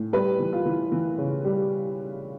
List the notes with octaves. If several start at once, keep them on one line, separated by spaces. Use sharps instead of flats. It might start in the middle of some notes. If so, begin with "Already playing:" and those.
Already playing: A2
G3 B4
E3
F4
E3
E3
C#3
G3